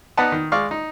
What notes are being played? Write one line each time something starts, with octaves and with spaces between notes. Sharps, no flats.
B3 D#4 B4 D5 F#5 A5
D#3
G#3 D5 F5 C#6
D#4